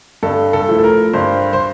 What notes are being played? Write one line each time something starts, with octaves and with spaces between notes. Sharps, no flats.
G2 A4
A4
F3 A3 E4
A4
A#4
G2 C5
C5